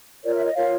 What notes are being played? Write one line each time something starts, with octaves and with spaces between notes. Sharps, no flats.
F4 A#4 C#5 D5
E5
D#5
F4 A#4 C#5 F5